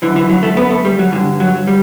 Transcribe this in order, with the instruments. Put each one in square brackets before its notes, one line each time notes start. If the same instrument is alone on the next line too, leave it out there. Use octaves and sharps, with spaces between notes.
[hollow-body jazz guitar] D3 E3
F#2
E3
F#3
A3
B3
A3
G3
F#3
G2 E3
D3
F#3
G3